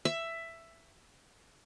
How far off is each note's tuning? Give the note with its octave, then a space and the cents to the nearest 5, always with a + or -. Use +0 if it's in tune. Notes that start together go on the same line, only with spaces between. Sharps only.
E5 +10